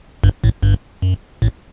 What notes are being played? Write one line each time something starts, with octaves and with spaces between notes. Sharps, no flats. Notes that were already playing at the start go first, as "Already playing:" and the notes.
G1 G2
A1 A2
G1 G2
F#2
A1 A2